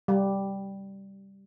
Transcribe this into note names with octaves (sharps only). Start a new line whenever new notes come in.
G3